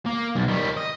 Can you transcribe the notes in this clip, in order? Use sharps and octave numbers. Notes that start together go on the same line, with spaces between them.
A#3
B1
D#3 G3
D#5